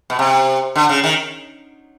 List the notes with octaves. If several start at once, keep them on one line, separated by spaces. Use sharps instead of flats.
B2
C3
D3
C#3
D#3